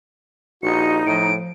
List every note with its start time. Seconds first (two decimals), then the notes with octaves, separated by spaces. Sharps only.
0.63 A#1 D#4 F#4 C#7
1.06 A2 F3 D7